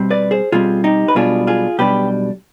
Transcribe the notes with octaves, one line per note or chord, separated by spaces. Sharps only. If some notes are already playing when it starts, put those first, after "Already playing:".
Already playing: B2 G3 C4
B4 D5
G#4 C5
B2 G3 C4 F4 G#4
D#4 G4
B4
B1 B2 G3 D4 F4 G#4
F4 G#4
B1 B2 G3 D4 G4 B4